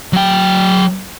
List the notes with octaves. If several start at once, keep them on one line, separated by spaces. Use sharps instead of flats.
F#3 G5